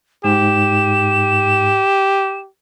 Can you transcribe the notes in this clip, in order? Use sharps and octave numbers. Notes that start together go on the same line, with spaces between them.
G#2 G4 E7